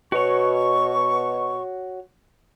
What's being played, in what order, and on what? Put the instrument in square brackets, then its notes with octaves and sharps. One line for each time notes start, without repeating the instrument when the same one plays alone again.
[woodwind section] B2 C#6 [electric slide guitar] F#4 C#5